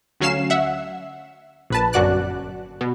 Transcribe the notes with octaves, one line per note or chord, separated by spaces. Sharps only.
D2 F#3 C#4 F5 C7 E7
E5 F#5
A#1 B4 A5
G1 F#2 F#4 D5 F#6
B2